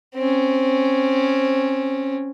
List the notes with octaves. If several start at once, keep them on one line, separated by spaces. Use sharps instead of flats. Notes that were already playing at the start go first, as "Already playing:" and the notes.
C4 C#4